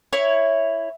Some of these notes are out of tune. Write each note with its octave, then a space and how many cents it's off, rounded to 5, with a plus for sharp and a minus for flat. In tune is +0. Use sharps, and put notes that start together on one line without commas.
E4 +0 C#5 +0